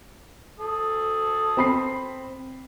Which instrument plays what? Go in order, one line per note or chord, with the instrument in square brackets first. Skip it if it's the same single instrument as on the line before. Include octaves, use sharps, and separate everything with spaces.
[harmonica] A4 D#6
[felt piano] C4 B5 C7